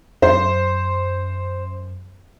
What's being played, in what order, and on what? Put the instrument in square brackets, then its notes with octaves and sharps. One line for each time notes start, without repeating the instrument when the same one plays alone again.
[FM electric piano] F#2 [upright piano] C5